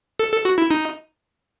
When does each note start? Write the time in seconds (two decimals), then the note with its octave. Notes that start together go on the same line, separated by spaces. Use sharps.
0.19 A4
0.32 A4
0.45 F#4
0.58 E4
0.71 D#4